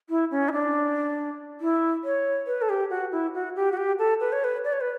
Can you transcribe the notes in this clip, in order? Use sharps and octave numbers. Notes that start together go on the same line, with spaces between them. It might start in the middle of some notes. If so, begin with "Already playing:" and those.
E4
C#4
E4
D4
E4
C#5
B4
A4
G4
F#4
E4
F#4
G4
F#4
G4
A4
B4
C#5
B4
D5
C#5
B4